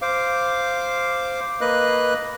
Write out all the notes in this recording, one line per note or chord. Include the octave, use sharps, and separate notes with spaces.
C5 F5 D6
A#3 B4 D#5 F#6